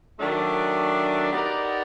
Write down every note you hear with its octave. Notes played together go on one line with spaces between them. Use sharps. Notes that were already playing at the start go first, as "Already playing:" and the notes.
D#3 F#3 A3 D4
B3 D#4 G4 A#4 D5